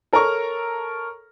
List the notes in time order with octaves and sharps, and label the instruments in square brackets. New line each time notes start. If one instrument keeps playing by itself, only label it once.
[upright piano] A4 A#4 C#5 A#5 C#6